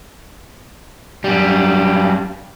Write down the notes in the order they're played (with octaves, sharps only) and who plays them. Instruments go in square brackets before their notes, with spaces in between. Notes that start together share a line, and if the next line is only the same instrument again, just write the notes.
[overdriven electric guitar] F#2 G3